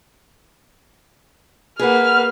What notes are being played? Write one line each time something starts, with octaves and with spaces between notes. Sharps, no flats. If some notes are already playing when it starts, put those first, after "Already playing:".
A#3 G#4 B4 F#5 F6